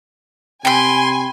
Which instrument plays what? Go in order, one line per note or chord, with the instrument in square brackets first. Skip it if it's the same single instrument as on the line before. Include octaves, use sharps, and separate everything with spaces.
[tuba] C3 [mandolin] G5 B5 [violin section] G#5 [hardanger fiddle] C6